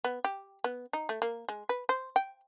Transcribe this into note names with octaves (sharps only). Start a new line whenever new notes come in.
B3
G4
B3
D#4
A3
A#3
G#3
B4
C5
G5